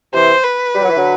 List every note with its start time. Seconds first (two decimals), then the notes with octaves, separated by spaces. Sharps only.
0.13 C3 E3 C5
0.44 B4
0.75 G3
0.81 F#3
0.89 E3
0.97 D3 F#3